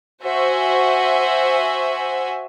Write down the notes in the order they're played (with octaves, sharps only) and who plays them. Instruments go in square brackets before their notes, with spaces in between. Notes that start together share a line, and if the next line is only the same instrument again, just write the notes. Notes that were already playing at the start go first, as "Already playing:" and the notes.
[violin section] F#4 C5 E5 G#5